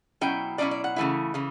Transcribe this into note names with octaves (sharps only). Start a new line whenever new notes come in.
B2 F#3 C#4 E4 G5
B2 F#3 C#4 E4 D5
D5
F#5
C#3 E3 A3 E4
C#3 E3